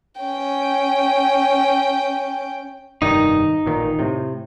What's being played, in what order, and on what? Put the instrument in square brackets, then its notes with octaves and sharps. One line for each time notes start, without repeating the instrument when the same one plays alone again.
[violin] C#4 G5
[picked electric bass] F1 G2 D#3 [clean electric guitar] D#4
[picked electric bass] A1 A#2 D#3
A2 C3